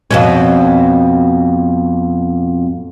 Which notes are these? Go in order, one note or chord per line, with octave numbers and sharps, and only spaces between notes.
F2 B2 C#4